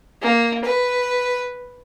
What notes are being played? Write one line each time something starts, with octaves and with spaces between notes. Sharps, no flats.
A#3
B4